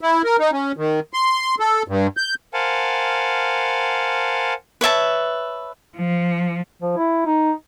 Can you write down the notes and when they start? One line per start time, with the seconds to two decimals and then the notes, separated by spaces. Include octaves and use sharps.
0.01 E4
0.24 A#4
0.39 D#4
0.52 C#4
0.77 D#3
1.13 C6
1.60 A4
1.88 G2
2.17 G6
2.54 A#4 C5 F5 F#5 G#5 A5
4.81 B4 C#5 E5 A5
5.95 F3
6.82 F3
6.97 E4
7.26 D#4